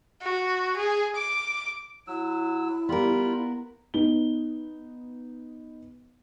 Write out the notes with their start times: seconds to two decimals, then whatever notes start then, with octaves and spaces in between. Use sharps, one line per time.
0.22 F#4
0.77 G#4
1.16 D6
2.07 F#3 E4 E6
2.89 G3 B3 F4 A#4 B5
3.94 B3 D#4 G7